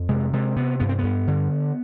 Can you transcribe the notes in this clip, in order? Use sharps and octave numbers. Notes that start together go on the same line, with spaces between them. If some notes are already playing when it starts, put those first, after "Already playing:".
Already playing: F2
C3 G#3
C3 G#3
C3 B3
G2 B3
C4
G2 B3
D3